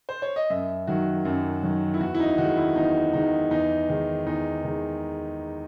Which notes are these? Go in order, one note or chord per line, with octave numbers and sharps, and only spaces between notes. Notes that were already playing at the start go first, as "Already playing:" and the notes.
C5
C#5
D#5
F#2 E5
D#3 F#3 F#4
F#2
D#3 F#3
E4
E2 F#4
E4
D#4
D#3 G#3 F#4
E4
E2 D#4
D#3 G#3 D#4
E2 D#4
D#3 G#3
E2 D#4
D#3 G#3